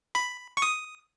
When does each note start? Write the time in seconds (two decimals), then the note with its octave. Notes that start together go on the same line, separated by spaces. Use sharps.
0.15 B5
0.57 C#6
0.62 D#6